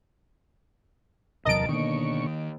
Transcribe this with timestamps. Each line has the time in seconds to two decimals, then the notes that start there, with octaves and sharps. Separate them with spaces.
1.45 D1 E2 C3 F#3 A#4 D#5 A5 D7
1.69 B2 D3 D#3 A#3 C#6